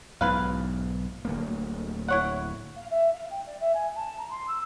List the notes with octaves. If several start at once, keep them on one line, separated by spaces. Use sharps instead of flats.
B1 G#2 E4 B4 F5
D1 D2 A#3
E4 C#5 F#5
F5
E5
F5
G5
D5
E5
G#5
A5
A#5
C6
E6